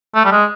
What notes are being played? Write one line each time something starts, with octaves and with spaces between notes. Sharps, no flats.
A3
G3
G#3